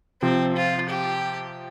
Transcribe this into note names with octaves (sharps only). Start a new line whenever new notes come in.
C3 F3 C4
F4
G4